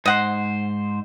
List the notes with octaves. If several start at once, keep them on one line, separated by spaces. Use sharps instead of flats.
G#2 C5 D#5 F#5